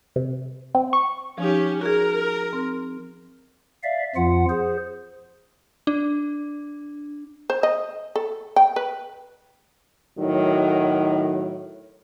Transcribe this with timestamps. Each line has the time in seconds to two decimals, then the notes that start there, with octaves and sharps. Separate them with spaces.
0.16 C3
0.75 C4
0.93 C#6
1.38 F3 C#4 D#4 G4
1.81 F#4 G#4 A#4
2.53 C4
3.83 D5 E5 F5
4.16 F2 F3 F4 F#5
4.49 G#4 C5
5.87 D4
7.50 C5
7.63 D#5
8.16 A4
8.56 G5
8.76 B4
10.18 A2 D#3 F#3